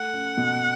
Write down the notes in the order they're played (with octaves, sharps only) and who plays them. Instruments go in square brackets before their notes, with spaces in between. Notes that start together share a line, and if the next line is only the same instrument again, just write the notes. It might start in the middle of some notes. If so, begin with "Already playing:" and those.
Already playing: [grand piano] A3 [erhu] F#5
[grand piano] C#4
B2